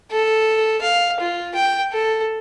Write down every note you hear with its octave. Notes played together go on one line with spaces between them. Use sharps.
A4
F5
F4
G5
A4